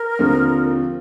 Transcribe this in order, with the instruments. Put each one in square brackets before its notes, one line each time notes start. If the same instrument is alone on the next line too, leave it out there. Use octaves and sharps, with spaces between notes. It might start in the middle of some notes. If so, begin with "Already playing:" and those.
Already playing: [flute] A#4
[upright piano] D#2 D3 F3 C4 F4